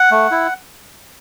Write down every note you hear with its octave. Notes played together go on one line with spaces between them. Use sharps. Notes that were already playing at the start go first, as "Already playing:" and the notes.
Already playing: F#5
A3
E4